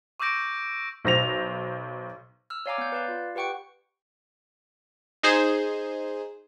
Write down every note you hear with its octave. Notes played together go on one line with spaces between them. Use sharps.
C#6 D6 E6 G6 A#6 D7
B1 C5 A#6 F7
E6 F6
C#5 D5 F5 G#5 A#5 D6
B3 G6
B4 D5 F5
F4
G4 B4 F#5 G5 C#6 C#7
D#4 G#4 C5